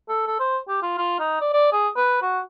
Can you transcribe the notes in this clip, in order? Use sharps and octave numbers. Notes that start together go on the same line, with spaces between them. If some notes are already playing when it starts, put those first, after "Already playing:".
A4
A4
C5
G4
F4
F4
D#4
D5
D5
G#4
B4
F#4